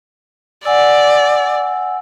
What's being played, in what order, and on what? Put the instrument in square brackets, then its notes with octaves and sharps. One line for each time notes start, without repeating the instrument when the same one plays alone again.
[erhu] D5 [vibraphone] F#5 G#5 E6